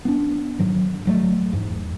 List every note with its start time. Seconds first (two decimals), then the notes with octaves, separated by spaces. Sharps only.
0.05 B3 C4 D4
0.59 G#2 D#3 F#3
1.05 D1 F#3 A3
1.53 E2 G#2